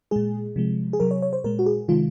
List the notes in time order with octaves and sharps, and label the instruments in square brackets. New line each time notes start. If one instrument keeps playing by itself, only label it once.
[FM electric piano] A#2 G#3 G#4
C3 F3 G#3
G#4
C3 F#3 A#4
C#5
C#5
C5
A#2 G#3 A#4
F#4
G#4
C3 D#3 G#3 F4